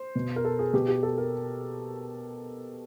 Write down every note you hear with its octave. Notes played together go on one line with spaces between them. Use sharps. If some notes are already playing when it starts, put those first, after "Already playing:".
Already playing: C5
B2
A#4
A4
G#4
B2 G4
G4
A4
A#4